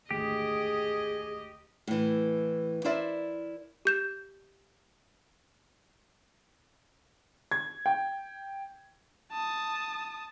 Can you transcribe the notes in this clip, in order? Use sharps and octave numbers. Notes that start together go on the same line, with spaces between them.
G#1 D2 G4 G#4 D#5
A2 E3
E4 A#4 C5 D5 E5
G4 G6 E7
G#6
G5
A5 D#6